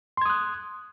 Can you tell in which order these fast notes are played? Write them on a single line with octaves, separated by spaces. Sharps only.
C6 G#6 D#6 F#6